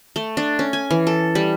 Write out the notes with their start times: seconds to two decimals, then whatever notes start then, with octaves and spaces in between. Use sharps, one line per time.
0.16 A3
0.37 D4
0.59 C#4
0.73 G#5
0.90 E3
1.07 A4
1.35 G3